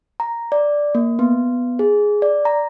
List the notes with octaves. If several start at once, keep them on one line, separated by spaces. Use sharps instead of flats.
A#5
D5
A#3
B3
G#4
D5
A#5